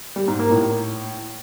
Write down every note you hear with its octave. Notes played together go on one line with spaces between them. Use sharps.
G3
G#2
A#3
A2